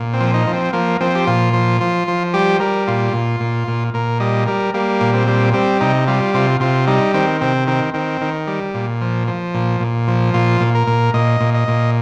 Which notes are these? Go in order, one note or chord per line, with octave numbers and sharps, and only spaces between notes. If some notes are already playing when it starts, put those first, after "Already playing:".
Already playing: A#2
C4
F3
D#4
F3
C4
F3 A#3
F3 C4
G4
A#2 F4
F3
F3
F3
G3 G4
G3 A#4
A#2 F4
A#2
A#2
A#2
A#2 A#4
G3 D#5
G3 A#4
G3 A#3
A#2
C4
G3
G3 C4
C3 D#4
G3 F4
C3 F4
C3 F4
G3 D#4
D#3 C4
C3 C4
D#3 C4
D#3 C4
D#3
G3
A#2
F3
F3
A#2
A#2
F3
A#2 F4
A#2
A#4
A#2
A#2 D#5
A#2
D#5
A#2